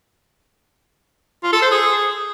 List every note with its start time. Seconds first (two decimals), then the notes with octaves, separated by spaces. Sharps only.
1.43 F4
1.53 A4
1.62 C5
1.71 G#4